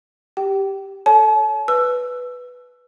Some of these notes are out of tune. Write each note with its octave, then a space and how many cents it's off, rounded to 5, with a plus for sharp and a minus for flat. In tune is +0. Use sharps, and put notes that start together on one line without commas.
G4 +0 G5 -30
A4 +0 C#5 +25 A5 -40
B4 +0 E6 +20